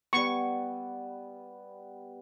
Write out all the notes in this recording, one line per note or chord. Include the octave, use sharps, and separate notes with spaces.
G3 B3 C#6